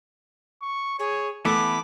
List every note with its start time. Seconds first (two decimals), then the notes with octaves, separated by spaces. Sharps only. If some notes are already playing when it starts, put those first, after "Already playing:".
0.61 C#6
0.99 G#4 C#5
1.45 E3 A3 B3 B5 D6